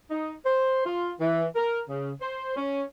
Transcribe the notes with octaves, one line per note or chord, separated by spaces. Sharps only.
D#4
C5
F4
E3
A#4
C#3
C5
C#4